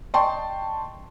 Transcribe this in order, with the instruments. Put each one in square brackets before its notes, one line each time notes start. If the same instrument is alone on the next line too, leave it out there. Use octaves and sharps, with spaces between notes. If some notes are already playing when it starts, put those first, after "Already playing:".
[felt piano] D5 D#5 G5 A5 C6 C#6